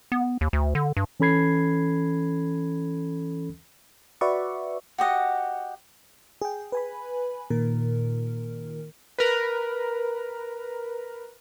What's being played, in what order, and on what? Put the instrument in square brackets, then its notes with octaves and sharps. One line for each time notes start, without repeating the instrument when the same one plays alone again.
[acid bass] B3
D#2
D2
D3
G2
[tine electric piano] E3 C#4 A4 B5 G#6 C7
[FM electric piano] F#4 B4 D5 E5 C#6
[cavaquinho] F#4 G4 D#5 F#5
[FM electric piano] G#4 G5
B4 G#5 B5
A#2 D#3 A#4
[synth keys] A#4 B4